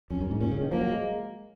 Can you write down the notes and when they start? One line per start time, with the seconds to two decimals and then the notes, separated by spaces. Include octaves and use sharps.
0.10 F2 C#4
0.21 F#2
0.31 G#2
0.41 A#2 C#4
0.51 C#3
0.62 D#3
0.71 F3 A#3
0.81 F#3
0.92 G#3